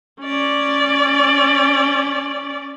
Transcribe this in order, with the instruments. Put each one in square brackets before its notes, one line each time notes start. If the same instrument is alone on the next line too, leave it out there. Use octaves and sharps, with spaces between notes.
[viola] C#4 D5